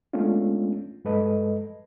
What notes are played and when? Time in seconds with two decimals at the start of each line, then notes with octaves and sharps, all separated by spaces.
0.13 G#3 A3 B3 C#4 D4 F4
1.05 G2 G#3 A4 B4 D#5